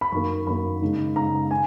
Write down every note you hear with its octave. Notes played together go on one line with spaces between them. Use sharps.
B5
F#2 D#3 A#3 C#6
F#2 D#3 A#3 B5
C#3 G#3 D#4
C#3 G#3 D#4 A#5
D#3 G#5